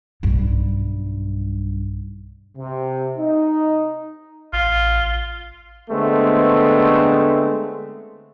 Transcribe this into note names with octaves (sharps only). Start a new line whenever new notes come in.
B1 G2
C3
D#4
A1 F4
D3 G#3 A3 B3 C4